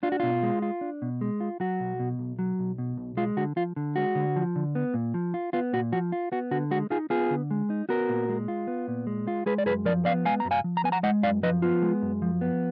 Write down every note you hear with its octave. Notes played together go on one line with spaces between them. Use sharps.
D4 F4
F#4
B2 F4
G#3
F4
D4
B2
G#3
F4
F#3 F#4
B1
B2
B1
F#3
B1
B2
B1
G#3 F4
D3 F#4
F3 F4
D3
G#3 F#4
D3
F3
D3
B3
A#2
F3
F4
B3 F4
A#2 F#4
F3 F#4
F4
B3 F#4
D3 F#4
G#3 F#4
D#4 F4 G#4
B3 F4 G#4
D3
G#3
D#4
B3 F#4 A#4
A#2
G#3
F4
B3
A#2
G#3
F4
G#3 G#4 B4
D5
F#2 G#4 B4
F3 A#4 D5
B3 D5 F5
G#3 F5 G#5
F#2 A#5
F5 G#5
F3
A#5
B3 G#5
F#5 A#5
G#3 D#5 F#5
F#2 D5 F5
F3 B4 D#5
B3 F4
G#3
F#2
F3
B3